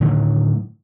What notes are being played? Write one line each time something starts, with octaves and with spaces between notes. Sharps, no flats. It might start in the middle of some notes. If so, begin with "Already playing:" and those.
A2 D3 D#3 F#3